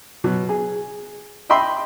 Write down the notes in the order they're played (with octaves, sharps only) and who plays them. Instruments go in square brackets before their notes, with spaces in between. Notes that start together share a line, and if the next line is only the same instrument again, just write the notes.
[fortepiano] B2 F#3
G#4
D#5 E5 G5 B5 C6